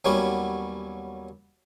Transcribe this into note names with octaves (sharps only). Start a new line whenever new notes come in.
D#2 F#3 G3 B3 C#4